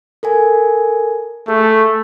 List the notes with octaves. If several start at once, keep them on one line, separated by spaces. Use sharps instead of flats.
A4 A#4 G#5
A3 G#4